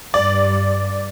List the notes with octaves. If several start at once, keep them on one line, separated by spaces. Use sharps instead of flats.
G2 D5